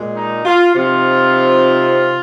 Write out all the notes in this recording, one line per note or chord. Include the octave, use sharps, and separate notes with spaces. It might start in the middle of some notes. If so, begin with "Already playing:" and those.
Already playing: A#2 G#3
D#4
F4
C3 F3 C4 D#4 F4